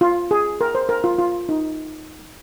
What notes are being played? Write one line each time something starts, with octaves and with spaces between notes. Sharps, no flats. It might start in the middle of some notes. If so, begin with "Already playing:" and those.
F4
G#4
A#4
C5
A#4
F4
F4
D#4